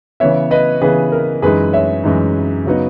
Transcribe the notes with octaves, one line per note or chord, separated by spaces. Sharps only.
C#3 E3 B3 C#5 E5
B4 D#5
C#3 E3 B3 G#4 B4
A#4
F#2 E3 G#3 D#4 G#4 B4
C#5 E5
F#2 E3 G#3 D#4
C#3 F#3 B3 D#4